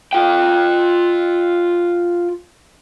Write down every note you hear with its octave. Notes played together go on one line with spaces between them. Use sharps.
F4 G5